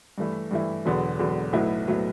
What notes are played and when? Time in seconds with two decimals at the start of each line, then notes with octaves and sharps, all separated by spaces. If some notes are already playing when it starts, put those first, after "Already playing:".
0.18 G2 E3 A3 E4
0.51 G2 E3 A3 E4
0.85 E1 E2 D3 F#3 B3
1.19 E1 E2 D3 F#3 B3
1.53 B1 A2 F#3 B3 E4
1.88 A2 F#3 B3 E4